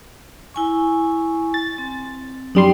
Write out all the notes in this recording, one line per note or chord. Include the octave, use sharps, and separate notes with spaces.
E4 G#5 C#6
A6
C4
F#2 G3 D#4 D5 G5 C6